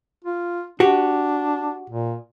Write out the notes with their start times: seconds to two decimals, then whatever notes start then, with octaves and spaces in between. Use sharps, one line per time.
0.25 F4
0.80 D4 F#4 G4
1.90 A#2